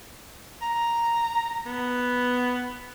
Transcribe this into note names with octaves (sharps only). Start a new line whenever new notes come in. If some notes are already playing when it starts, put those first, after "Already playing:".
A#5
B3